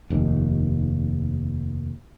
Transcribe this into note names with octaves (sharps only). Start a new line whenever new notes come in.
F1 D#2